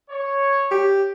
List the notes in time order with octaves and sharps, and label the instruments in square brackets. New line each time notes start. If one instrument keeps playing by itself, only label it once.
[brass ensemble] C#5
[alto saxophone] G4